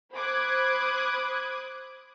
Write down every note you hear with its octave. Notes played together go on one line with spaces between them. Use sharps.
C5 B5 D6 D#6 F#6 G#6